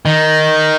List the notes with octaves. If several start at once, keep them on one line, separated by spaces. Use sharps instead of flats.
D#3